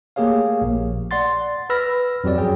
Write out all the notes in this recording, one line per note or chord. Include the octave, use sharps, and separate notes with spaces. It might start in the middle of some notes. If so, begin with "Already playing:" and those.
A3 A#3 G4 G#4 C#5 F5
A#1
D5 F#5 C6 A6
B4 B5 E6 F6 A#6
F2 F#3 G4 D5
F#2 F#3 G#4 G5